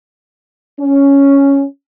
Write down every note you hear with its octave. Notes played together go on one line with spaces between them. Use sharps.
C#4